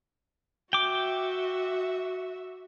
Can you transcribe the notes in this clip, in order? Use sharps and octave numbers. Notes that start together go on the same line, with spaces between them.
F#4 E5 G5 D6